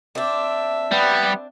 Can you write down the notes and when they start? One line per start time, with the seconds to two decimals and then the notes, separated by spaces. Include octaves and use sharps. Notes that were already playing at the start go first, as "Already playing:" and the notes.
0.15 C4 D4 E5
0.92 G3 B3